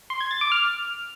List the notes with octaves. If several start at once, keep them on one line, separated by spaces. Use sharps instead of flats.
C6
G#6
A6
D6
F6